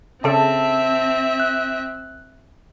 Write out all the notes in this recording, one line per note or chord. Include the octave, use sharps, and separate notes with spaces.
C#3 C4 A4 E5 A5
F#6